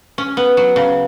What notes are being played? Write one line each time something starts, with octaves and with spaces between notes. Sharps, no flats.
C#4
B3
F#3
C#3